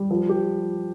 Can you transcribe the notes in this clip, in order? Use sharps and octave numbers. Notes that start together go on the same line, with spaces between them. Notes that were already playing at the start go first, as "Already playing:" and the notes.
Already playing: G3
F3
G4